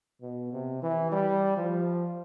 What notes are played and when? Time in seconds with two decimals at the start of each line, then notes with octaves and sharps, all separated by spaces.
0.22 B2
0.53 C3
0.82 E3
1.12 G3
1.57 F3